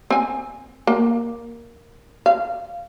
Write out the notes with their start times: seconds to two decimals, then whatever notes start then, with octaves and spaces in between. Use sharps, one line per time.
0.10 C4 G#5
0.87 A#3
2.26 F5